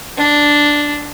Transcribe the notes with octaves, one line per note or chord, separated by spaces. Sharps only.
D4